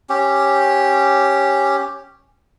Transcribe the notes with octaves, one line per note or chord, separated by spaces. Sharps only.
C#4 G4